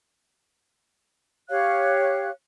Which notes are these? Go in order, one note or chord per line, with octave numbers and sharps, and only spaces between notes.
G4 C#5 F5 F#6